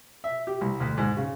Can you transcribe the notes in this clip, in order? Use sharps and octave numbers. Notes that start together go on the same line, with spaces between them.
E5
G4
C2
D2
G#2
C#3